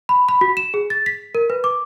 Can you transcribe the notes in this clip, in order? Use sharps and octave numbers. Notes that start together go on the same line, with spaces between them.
B5
B5
F#4
E7
G#4
A6
B6
A#4
B4
D6